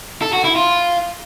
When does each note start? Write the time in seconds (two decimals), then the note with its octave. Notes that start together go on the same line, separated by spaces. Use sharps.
0.22 A4
0.33 F#4
0.44 E4
0.56 F4